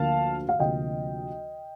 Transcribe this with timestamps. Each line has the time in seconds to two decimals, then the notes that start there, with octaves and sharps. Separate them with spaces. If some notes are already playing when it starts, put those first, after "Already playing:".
Already playing: D2 D3 F3 A#3 F5 A5
0.49 F5
0.59 D2 C3 F3 A#3 D#5 G5